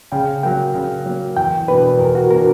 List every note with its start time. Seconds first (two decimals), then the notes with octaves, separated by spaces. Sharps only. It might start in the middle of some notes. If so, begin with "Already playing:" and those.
0.12 C#3 G5
0.43 F#3 A#3 G5
0.75 C#3
1.06 F#3 A#3
1.36 E2 G5
1.68 B2 A#3 D4 B4
1.99 E2 A#4
2.15 F#4
2.30 B2 A#3 D4 A#4